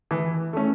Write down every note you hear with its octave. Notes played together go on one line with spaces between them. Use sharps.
E3
A3 C#4